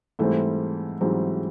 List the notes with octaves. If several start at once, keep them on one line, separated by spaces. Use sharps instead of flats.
G#2 E3 G3 A3 C4
G#2 E3 F#3 G3 C4